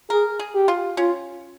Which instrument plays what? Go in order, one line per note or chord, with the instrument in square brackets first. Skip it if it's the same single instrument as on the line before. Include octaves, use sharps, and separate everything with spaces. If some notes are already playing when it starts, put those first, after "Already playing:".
[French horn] G#4 [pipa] A#4
[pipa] G#4
[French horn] G4
[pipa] F4
[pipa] C#4 [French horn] F4